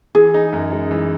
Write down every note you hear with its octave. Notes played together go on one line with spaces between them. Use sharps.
E3 G#4
D#4
F#2
G#3
E3